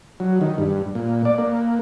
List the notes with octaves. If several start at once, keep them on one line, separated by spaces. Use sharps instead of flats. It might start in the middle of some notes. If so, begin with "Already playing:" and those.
F#3
D#3
G2
A#2
D5
A#3